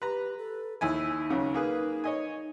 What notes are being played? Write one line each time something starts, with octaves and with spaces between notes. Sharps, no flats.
G4 B4 A#5
A4
D#2 D#4 E4 G#5
C#2 C#3 F#3
A#3 G#4 B4
C#5 D#5 G#5